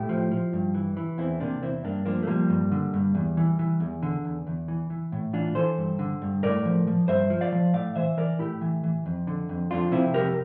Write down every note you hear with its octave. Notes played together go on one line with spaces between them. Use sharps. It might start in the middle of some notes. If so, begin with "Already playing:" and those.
Already playing: A2 E4 G4
F3
F3
G2
E3
E3
E2 C4 E4
C3 A#3 D4
E2 C4 E4
G2 A#3 D4
F3 A#3 D4
A3
F3 G3 A#3
G2
D3
G2
E2
E3
E3
E2
D3
E2
E2
E3
E3
A2
E3 D4 F4
E3 A4 C5
G2
D3
G2
A2 A#4 D5
F3
F3
G2 C5 E5
F3
D5 F5
F3
A2 D5 F5
E3 C5 E5
E3 A#4 D5
A2 E4 G4
E3
E3
F2
D3
F2
F2 D4 F4
C3 C4 E4
F2 G4 A#4